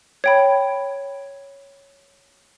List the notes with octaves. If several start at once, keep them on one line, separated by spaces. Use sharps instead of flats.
C#5 G5 B5